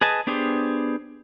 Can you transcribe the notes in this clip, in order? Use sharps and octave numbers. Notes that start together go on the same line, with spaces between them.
G#4 B4 D#5 G#5 A5
B3 D4 G4 G#4 C5